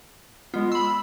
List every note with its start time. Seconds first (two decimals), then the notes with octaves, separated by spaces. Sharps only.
0.54 G#3 B3 F4
0.72 B5 C6 E6